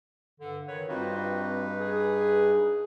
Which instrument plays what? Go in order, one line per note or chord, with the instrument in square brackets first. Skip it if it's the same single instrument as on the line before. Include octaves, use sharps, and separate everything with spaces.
[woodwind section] G2 D3
D#3 B4 C#5
[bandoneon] G2 D#4 B4 [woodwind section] C4 F4 F#4
[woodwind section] G#4